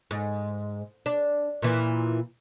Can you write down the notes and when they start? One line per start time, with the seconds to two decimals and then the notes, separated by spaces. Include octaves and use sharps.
0.11 G#2
1.06 D4
1.62 A#2 E3